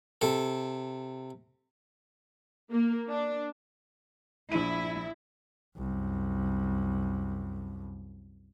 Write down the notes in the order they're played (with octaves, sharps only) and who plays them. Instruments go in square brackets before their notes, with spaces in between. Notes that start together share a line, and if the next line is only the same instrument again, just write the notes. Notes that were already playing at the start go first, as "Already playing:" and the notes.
[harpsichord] C3 A4
[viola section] A#3
D4
[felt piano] A#1 D#7 [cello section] E4
[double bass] C2 F#2